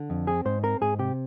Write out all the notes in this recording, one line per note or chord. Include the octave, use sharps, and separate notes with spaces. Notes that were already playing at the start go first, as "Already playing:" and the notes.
Already playing: D3
F2
C4 G#4
G#2 C5
C4 A#4
G#2 G#4
C3 G4